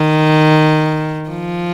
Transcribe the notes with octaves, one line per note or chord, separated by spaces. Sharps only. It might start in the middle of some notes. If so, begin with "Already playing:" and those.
Already playing: D#3
F3